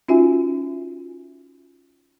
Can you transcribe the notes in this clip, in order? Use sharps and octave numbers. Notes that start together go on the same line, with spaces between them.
C#4 D#4 F4 F#4 E5 G#5